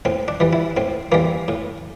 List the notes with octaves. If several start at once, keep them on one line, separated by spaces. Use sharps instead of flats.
A2 C4
D4
E3 G3
E4
A2 C4
E3 G3 A#3
A2